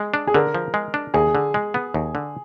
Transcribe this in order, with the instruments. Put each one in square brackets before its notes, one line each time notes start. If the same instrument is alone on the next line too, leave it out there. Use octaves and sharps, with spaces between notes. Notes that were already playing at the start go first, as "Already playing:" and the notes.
Already playing: [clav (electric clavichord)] G#3 [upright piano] G#4
[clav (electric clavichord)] D4
[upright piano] G#4
[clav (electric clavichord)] D3 [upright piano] A#4
[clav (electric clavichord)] F3
G#3
D4
[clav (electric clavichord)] D#2 [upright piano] G#4
[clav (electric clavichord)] D3
G#3
B3
D#2
D3